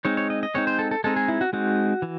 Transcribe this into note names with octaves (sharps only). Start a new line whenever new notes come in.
G#3 C4 D#4 C#5
C#5
D#5
D#5
G#3 C4 D#4 C#5
C5
A4
A4
G#3 C4 D#4 A4
G#4
E4
F#4
G#3 C4 D#4 F#4
E3